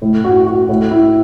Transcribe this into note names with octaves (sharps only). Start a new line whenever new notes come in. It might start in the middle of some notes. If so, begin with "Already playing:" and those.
A2
F#4
F#4
A2
E4